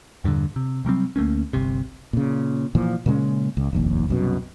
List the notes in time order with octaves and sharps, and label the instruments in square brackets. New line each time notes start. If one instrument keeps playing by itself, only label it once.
[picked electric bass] E2 G2 A#2 D3
C3
C3 F#3 G3 C4
D2 A3 A#3 C#4
G1 C2 C3
[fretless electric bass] A#2 C#3
A#2 E3 F3
A#2 C#3 G#3 C#4
C#2
F1 A#1 D#2
C2 F#2 B2